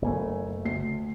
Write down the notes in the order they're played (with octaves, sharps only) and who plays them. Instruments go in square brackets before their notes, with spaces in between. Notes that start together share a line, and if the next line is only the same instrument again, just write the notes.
[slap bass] F#1 A3 [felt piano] B1 A#3 G#5
[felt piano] D2 C7